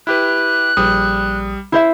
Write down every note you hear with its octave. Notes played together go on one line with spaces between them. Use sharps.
E4 G4 B4 F#6
A#1 G3 D#6
E4 C5 E5